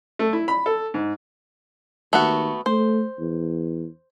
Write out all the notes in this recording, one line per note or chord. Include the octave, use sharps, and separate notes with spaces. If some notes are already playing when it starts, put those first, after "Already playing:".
A3
E4
B5
A4
G#2
D#2 A3 B3 F#4
A3 C5
E2